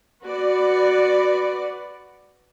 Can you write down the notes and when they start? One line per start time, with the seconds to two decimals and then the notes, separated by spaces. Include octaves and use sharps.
0.24 F#4 B4 D5